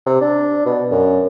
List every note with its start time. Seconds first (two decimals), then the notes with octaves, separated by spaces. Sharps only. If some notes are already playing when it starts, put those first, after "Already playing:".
0.06 C3
0.21 D4
0.66 B2
0.91 F#2